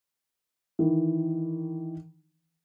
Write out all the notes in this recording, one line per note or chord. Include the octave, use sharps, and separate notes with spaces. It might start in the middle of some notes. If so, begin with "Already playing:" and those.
D#3 E3